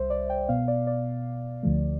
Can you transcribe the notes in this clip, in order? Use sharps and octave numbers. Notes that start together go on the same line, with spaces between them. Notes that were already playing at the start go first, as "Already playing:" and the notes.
Already playing: C2 G3 C5 E5
D5
G5
B2 B3 F5
D5
D5
D2 D3 F3 A3